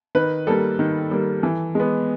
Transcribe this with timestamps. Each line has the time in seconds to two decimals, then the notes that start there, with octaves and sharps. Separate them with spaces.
0.15 D#3 B4
0.47 G3 A#3 A4
0.79 D#3
1.11 G3 A#3
1.43 E3
1.75 G#3 B3